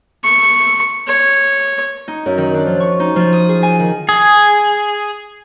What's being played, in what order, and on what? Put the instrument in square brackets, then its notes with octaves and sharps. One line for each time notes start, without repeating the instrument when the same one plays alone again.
[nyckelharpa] C#6
C#5
[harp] D#4
F#2
D#3
D4
F3
C#6
D#4
F3
D#6
G#4
G#5
D#3
[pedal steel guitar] G#4